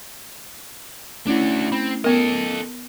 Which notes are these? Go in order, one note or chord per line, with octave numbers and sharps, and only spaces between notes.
A3 C#4 D4 E4 F#4
C4 B5
B3 A4 A#4 D#5